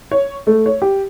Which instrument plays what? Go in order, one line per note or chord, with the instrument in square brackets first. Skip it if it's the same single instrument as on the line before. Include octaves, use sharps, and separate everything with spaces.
[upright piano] C#5
A3
C#5
G4